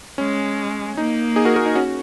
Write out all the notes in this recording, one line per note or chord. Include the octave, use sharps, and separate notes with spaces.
G#3 C#4
A#3 D#4
D#4 G#4
F#4 A#4
F#4 A#4
D#4
C#4 F#4